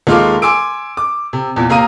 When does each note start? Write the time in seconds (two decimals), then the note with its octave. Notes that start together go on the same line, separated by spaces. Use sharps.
0.07 D#2 G#3 F4 A4 F5 D6
0.42 G#5 C6 D6 E6 D7
0.97 D6
1.33 C3
1.56 E2 A#2
1.69 C3 A#3 F5 A#5 D#6 D#7